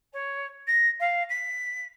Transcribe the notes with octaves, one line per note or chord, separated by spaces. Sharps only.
C#5
A#6
F5
B6